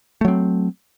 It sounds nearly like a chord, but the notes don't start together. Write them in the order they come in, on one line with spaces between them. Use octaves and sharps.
A3 F#3 C4